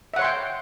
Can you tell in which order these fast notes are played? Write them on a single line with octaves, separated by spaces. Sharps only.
E5 F#5 C#5 C6 G5